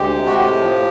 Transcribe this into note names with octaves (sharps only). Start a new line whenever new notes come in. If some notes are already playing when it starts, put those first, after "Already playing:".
Already playing: D2 G#3 G4
C3
F#4
A2 G4
F3